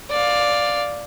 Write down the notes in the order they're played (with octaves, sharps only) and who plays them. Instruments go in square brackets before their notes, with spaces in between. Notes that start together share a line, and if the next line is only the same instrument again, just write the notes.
[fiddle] D5 F5